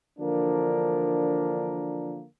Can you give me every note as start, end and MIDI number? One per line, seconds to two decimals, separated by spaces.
0.19 2.24 50
0.19 2.24 52
0.19 2.24 53
0.19 2.24 58
0.19 2.24 62
0.19 2.24 70